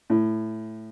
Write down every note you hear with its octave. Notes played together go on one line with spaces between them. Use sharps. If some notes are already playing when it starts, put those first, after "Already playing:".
A2